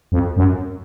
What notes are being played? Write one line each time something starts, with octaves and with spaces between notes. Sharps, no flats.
F2
F#2